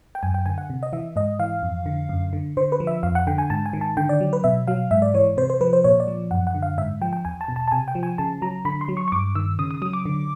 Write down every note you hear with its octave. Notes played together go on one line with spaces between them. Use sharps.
G5
F#2 G#5
G5
D3 G#5
F#5
C3
D#5
E3 E5
G#2 D#5
E3 F5
F2
D3
F#2
D3
D3 C5
B4
F3
E5
F2 F5
F#5
D3 G5
G#5
G#2 A5
G#5
D#3
A5
D3 G5
D5
F#3
B4
B2 E5
F#3 F5
G#2 E5
D5
E3 C#5
C3 C5
C5
F3 B4
C5
A#2 C#5
D5
F3
F#2 F#5
F#5
D3
F5
G#2 E5
F3 G5
G5
E2 G#5
A5
B2
A5
A5
C3 G#5
G5
F3
G#5
C#3 A5
F#3 A#5
D3 B5
C6
F#3
C#6
C#6
G2 D6
D#3 E6
C#3 D#6
D#6
F#3 D#6
D6
D3